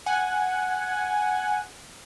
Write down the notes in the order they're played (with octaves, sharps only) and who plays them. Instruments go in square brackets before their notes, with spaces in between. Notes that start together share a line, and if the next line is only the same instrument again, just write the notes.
[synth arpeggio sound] F#5 G#5